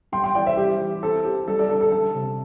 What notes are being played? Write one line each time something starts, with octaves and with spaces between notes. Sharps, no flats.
G3 G5 C6
G5 C6
E3 D5 G5
C5 E5
G3 G4
E3
C4 A4
E3 G4
G3 A4
A4 D5
D3 A4
A4
G3 A4
C3